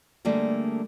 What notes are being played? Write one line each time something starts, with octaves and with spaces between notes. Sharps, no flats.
D3 G3 A3 A#3 G#4